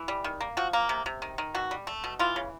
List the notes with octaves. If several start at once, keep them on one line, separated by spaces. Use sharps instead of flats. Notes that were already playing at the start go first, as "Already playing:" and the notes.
Already playing: E3
G3
D#3
A#3
F3 F#4
A#3
C3
C3
D#3
D#3
B2 F#4
G3
A3
B2
E3 F4
C#3